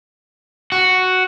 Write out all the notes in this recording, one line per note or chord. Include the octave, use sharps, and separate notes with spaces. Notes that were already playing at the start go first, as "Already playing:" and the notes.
F#4